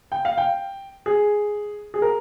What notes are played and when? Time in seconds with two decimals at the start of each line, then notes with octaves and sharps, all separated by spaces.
0.12 G5
0.25 F5
0.38 G5
1.06 G#4
1.94 G#4
2.02 A#4